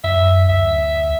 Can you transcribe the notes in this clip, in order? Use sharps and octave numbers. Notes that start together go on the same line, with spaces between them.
F#2 E5
D2 E5